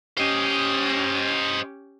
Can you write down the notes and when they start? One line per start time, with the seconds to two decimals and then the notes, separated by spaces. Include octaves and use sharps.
0.17 C#4 G4 C5 D#5